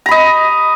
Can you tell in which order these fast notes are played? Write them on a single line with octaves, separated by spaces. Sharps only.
A#5 B5 D#5